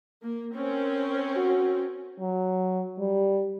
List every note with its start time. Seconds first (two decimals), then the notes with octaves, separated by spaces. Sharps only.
0.23 A#3
0.54 C4 C#4 A#4
1.36 F#4
2.19 F#3
2.98 G3